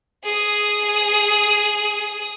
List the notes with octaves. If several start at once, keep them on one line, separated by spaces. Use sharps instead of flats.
G#4 D#6